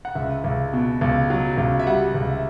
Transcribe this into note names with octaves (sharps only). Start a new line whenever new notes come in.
F#5
C#2 E5
C#2
B2
C#2
F#3
C#2
E5
G3 F#5
C#2
E5